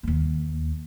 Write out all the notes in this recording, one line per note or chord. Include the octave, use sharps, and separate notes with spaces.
D#2 A#3